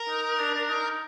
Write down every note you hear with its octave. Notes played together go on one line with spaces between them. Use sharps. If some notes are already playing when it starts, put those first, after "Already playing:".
Already playing: A#4
D#4
D4
D4
D#4